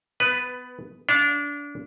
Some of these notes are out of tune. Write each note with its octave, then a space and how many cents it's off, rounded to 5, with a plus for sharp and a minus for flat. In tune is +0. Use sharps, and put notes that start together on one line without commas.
B3 +20 B4 +0
D4 -25 F5 +15